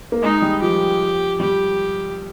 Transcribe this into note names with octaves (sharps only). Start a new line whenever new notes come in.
A#3
G#3 D#4
G3
F3 G4
G3 G4